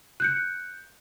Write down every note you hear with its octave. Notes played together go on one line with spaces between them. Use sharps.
F#6 G6 C#7